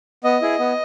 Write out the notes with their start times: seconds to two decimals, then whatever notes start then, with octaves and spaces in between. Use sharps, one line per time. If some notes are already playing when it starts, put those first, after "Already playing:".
0.24 B3 D#5
0.42 E4 G#4
0.59 B3